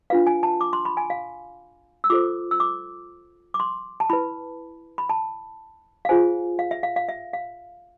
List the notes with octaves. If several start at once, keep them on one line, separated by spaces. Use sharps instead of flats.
D4 F4 B4 F5
G#5
A5
D6
C6
B5
G#5
F5
E6
F4 A4 C5 D6
E6
D6
D6
C6
A5
E4 B4 B5
B5
A5
F5
F4 G#4 C5 G#5
F5
E5
F5
F5
E5
F5